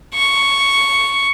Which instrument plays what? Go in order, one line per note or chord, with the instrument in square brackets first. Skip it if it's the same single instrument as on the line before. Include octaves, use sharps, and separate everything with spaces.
[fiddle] C#6